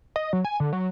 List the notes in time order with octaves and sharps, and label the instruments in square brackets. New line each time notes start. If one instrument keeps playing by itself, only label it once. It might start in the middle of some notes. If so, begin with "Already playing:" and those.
[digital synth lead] D#5
F#3
G#5
D3
F#3